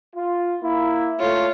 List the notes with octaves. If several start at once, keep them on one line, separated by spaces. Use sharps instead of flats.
F4
A#3 E4
A3 F4 C#5